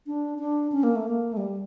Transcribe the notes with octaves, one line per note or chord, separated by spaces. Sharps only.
D4
D4
C#4
A#3
A3
A#3
A3
G3